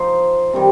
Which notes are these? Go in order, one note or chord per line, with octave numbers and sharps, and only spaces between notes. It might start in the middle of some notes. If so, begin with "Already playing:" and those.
Already playing: F3 D#4 C5
C3 D#3 G3